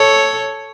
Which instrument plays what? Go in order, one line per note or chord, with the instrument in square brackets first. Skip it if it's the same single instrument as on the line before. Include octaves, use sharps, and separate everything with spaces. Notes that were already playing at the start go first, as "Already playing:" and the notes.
Already playing: [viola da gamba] A4 C#5